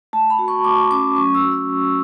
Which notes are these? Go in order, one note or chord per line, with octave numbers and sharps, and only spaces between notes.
A3 A5
B5
F#4
C#6
A3 D6
C#4 D6
F#3 C#6
E6
F#4
E6
F#3